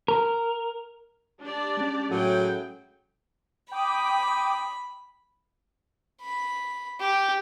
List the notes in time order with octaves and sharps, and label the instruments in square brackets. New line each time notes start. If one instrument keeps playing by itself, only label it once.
[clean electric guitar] A#4
[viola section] D4 G4 D5
[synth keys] G#3 C#4
[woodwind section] A2 [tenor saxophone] F#3 [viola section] G#4 G5
[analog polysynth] G5 D6 D#6 [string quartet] B5
[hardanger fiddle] B5
G4